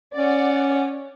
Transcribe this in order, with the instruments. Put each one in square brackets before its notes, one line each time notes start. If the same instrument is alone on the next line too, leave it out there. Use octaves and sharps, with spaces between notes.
[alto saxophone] C#4 [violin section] D5 F#5